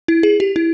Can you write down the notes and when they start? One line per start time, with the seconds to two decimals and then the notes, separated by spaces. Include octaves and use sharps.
0.08 E4
0.23 G#4
0.40 G4
0.56 E4